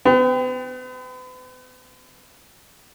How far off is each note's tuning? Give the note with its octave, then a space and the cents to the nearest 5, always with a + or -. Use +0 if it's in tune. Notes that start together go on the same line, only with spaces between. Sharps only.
B3 +40 G5 +5